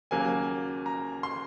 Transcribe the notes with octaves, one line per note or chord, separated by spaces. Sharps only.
D#2 C#3 F#3 A#3 G#5
A#5
C6